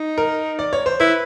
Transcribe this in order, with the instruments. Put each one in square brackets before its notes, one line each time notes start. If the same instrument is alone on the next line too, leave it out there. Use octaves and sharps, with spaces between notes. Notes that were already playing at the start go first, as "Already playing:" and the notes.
Already playing: [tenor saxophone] D#4
[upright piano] A#4
D5
C#5
C5
[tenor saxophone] E4 [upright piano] B4